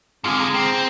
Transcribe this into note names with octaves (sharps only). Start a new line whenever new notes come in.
G#2 D3 C4 F4 G#4
G#4 A#5
C4